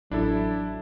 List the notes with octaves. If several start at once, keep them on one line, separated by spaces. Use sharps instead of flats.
A1 F#3 D4 E4 A4